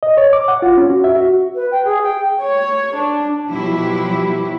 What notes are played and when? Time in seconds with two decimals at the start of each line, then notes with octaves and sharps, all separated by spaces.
0.03 D#5
0.17 C#5
0.33 D6
0.48 F#5
0.62 F4
0.77 C#4
0.89 F#4
1.04 E5
1.16 F#4
1.55 B4
1.71 G5
1.85 G#4
2.02 G5
2.42 C#5
2.96 D4
3.49 B2 F3 F#3 E4 G4